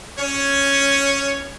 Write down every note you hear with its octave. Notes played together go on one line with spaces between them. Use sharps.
C#4 C#5